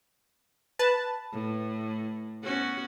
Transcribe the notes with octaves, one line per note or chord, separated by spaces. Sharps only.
B4 A5
A2
B3 C#4 F#4